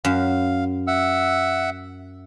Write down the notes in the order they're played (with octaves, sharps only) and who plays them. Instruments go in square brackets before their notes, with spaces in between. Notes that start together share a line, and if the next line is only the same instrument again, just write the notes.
[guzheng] F#2 [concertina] F5
[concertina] E5 F#5 E6